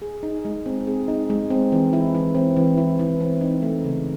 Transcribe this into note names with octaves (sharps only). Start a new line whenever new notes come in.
G#4
D#4
G#3
C4
G#4
D#4
G#3
C4
E3
E4
E3
C4
E3
E4
E3
C4
D#4
A3
C#3